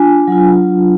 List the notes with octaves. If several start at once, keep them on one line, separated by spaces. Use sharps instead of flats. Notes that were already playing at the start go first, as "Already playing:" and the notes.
Already playing: D4 F4 G#5
F#3 D4 F4